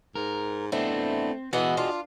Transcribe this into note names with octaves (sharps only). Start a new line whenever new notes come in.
G#2 A#4
A3 B3 C4 D4 E4
E3 B3 F#4 G#4 D#5 F#5
D4 F4